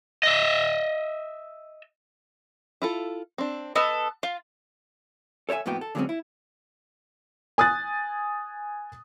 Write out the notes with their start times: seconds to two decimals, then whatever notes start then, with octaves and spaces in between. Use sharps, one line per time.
0.23 D#5 E5
2.82 E4 F4 A4
3.38 C4 D4
3.76 B3 A4 B4 D#5
4.23 F4 F5
5.49 A4 C#5 D5 E5 G#5
5.66 F2 A2 A#3 B3 F#4 G5
5.81 A4
5.95 D3 F#3 G#3 A#3 C4 C#4
6.09 E4
7.58 G#5 D#6 F#6 A6